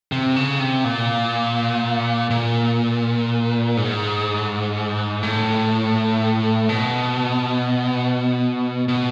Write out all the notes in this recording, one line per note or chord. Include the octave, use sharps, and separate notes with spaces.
C3
C#3
C3
A#2
A#2
G#2
A2
B2
B2